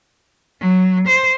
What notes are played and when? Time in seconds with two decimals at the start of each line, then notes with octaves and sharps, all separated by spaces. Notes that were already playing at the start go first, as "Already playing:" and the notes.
0.60 F#3
1.07 C5